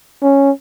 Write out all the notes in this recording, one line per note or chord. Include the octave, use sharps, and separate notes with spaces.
C#4